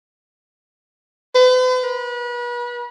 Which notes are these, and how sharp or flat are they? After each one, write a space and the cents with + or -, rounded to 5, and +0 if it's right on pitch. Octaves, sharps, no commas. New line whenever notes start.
B4 +45
B4 -35